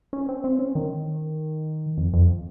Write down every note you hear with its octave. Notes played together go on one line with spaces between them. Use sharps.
C#4
C4
C4
C#4
D#3
F2
F2